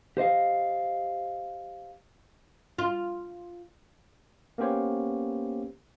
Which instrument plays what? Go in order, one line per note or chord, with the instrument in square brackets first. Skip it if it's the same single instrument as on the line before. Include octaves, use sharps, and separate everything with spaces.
[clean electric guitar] G4 C5 D#5 F5
[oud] F4
[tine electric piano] A#3 B3 C#4 G4 C5 C#5